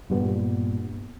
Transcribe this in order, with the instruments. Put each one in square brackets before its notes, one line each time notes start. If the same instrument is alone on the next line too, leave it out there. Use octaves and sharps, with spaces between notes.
[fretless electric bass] G2 A#2 G3 B3